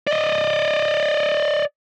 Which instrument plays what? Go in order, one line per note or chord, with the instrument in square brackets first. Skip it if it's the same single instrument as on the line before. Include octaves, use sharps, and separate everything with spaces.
[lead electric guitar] D5 D#5